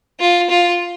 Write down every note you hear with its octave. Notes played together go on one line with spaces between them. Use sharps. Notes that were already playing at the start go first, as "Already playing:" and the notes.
F4
F4